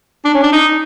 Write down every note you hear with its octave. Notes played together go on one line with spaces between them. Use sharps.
D4
C#4
D4
D#4